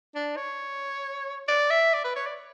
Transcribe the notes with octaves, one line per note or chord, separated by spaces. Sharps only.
D4
C#5
D5
E5
D5
B4
C#5
D5